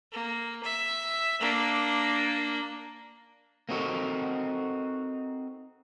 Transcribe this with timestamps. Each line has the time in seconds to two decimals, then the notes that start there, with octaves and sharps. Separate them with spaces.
0.12 A#3
0.63 E5
1.40 A#3 D4
3.69 A#3 C4 D#4 F#4 A4 A#4